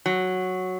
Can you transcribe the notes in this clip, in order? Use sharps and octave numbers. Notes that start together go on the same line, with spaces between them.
F#3